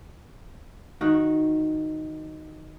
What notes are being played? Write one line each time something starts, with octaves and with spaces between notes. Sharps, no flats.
D#3 F#4